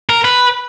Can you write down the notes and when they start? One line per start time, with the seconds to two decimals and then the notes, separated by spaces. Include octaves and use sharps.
0.09 A#4
0.24 B4